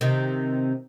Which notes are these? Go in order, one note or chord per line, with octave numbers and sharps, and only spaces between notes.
C3 D#3